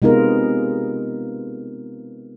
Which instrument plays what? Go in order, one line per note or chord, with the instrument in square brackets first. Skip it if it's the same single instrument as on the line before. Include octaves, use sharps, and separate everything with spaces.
[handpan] C3 G#3 B3 D#4 F4 A#4